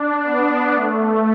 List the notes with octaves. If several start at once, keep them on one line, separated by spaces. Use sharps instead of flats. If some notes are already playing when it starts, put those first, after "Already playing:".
Already playing: D4
B3
A3